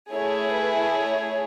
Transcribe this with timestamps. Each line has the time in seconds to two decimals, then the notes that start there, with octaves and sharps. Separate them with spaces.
0.10 A3 E4 G#4 C#5
0.54 B4
0.97 C#5